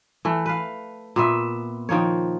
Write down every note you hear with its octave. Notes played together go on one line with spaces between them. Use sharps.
E3 A3
B4 F5
A#2 B3 E5
D#3 F3 A#3 C#5